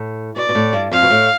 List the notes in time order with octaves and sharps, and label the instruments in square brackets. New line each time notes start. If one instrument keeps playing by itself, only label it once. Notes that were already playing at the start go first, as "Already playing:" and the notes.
Already playing: [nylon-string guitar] A2
[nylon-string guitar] B2 [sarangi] D5
[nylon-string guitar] B2
A2
G2
[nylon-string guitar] F2 [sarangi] F5
[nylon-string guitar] B2
A2